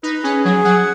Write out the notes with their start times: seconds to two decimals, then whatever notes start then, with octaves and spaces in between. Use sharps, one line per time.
0.03 D#4 B4
0.24 C#4 G#4
0.44 F#3 G#4
0.64 F#3 F#5